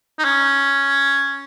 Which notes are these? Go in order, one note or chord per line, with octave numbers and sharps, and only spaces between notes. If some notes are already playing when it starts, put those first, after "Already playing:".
D#4
C#4